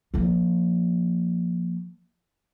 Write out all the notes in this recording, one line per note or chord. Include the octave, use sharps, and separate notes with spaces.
F3 A#3